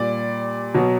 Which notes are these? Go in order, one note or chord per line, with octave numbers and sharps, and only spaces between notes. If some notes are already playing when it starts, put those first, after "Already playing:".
Already playing: A#2 G3 D5
B2 F#3